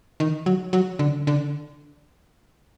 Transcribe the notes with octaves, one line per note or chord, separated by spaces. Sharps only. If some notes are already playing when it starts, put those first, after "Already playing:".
D#3
F#3
F#3
D3
D3